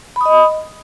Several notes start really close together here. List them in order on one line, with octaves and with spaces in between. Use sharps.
B5 D#6 D#5